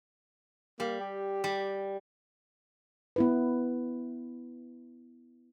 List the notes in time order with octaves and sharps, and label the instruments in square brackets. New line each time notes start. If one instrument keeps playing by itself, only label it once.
[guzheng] G3 [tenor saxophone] A#3
[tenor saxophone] G4
[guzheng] G3
[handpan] B3 E4 B4